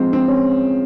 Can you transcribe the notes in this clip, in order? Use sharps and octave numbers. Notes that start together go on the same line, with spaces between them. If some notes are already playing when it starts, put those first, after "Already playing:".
Already playing: F3 G#3 C4
C4
C#4